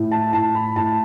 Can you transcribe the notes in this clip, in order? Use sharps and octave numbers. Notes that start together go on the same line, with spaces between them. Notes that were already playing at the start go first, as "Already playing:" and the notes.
Already playing: A2
A5
A2 A5
B5
A2 A5